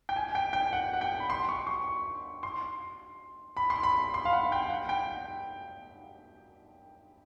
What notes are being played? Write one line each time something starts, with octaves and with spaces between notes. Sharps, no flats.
G5
G#5
G5
G5
F#5
F#5
G5
B5
C6
C#6
C#6
C6
B5
C6
B5
C6
F5
F#5
G5
F#5
G5